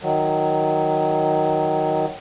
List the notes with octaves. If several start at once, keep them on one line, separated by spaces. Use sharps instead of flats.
D#3 F#3